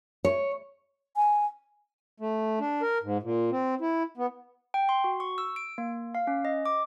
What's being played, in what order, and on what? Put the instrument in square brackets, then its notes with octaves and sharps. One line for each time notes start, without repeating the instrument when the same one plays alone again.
[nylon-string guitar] C#5
[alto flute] G#5
[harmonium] A3
D4
A#4
G#2
A#2
C4
E4
B3
[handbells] G5
C6
F#4
C#6
E6
D7
A#3
F5
C#4
D#5
D6